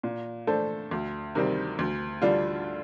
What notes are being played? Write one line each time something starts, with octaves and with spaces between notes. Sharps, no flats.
A#2
A3 D4 A4 C5
D2
C3 D#3 G3 C4
D2
D3 G3 D4 F4